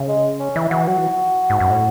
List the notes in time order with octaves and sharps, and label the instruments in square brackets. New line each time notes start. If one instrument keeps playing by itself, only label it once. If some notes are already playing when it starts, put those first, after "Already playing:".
Already playing: [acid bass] C#3
[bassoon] G#3
C#4
[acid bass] E3 [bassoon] E4
[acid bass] E3 [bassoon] F#4
[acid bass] F#3 [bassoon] F#4
[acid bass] E3
G#2
F#2
A2